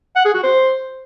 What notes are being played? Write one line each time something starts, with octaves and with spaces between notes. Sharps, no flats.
F#5
G#4
F#4
C5